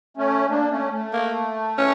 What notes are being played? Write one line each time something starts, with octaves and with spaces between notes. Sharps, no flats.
A3 C#4
A#3 D4
A3 C#4
A3
A#3
C#4